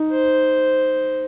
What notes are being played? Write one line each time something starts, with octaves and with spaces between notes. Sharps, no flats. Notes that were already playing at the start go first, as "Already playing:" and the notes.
Already playing: D#4
C5